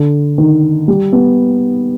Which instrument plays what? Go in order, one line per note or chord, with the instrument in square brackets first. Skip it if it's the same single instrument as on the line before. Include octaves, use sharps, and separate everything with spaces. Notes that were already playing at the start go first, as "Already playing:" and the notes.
Already playing: [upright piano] D3
D#3
G3
B3